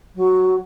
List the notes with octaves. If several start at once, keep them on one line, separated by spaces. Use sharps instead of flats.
F#3